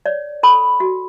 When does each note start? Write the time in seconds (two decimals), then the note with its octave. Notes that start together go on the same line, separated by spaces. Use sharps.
0.06 C#5 D5
0.43 A4 B5
0.80 F#4